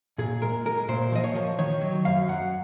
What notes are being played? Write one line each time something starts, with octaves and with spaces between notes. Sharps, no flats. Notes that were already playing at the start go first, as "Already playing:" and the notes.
A#2 G#4
G#3 A#4
G#3 A#4
A#2 C5
F3 D#5
C#5
F3
D#3 C#5
F#3
F#2 F5
F#2 F#5